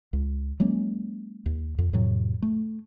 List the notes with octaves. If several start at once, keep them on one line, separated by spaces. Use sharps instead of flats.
C#2
F#3 G#3 A#3 C#4
D#2
F2
F2 A2 C3 F#3
A3